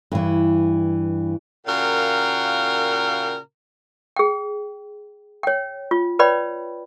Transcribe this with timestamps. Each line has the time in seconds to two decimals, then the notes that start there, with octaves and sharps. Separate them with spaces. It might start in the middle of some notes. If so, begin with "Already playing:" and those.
0.12 G2 E3
1.66 A#2 C#3 F#4 A#4 F5 G5
4.16 G#4 G5
5.43 C#5 G5
5.91 F4
6.19 B4 C#5 D5 G5 B5